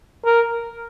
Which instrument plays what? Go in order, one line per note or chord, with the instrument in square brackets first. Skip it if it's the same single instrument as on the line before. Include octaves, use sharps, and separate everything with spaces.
[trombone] A#4